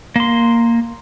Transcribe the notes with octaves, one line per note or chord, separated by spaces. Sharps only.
A#3 C6